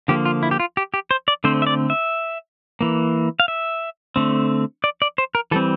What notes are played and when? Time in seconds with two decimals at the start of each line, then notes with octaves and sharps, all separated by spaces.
0.08 D3 F3 A#3 G4
0.25 F4
0.43 E4
0.51 G4
0.60 F4
0.77 G4
0.94 G4
1.11 C5
1.28 D5
1.44 D3 A3 C4 C5
1.62 E5
1.67 D5
1.90 E5
2.81 E3 A#3
3.40 F5
3.48 E5
4.16 D3 A3 C4
4.84 D5
5.02 D5
5.18 C5
5.35 A#4
5.51 E3 G3 C4 A4